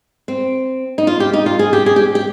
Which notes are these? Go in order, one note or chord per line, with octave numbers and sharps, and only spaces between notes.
C4
D#4
F4
G4
D#4
F4
G#4
G4
G#4
G4
G4